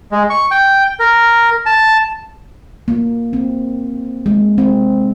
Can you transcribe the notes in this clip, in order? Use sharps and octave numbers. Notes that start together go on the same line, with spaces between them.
G#3
C#6
G5
A#4
A5
A#3
C4
G#3
C4